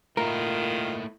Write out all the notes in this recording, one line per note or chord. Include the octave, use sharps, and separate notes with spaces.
D#3 A3 A#3 E4 F4 A#4